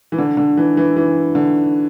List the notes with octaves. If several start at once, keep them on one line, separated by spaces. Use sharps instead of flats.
E3
D3
D3
E3
E3
E3
D3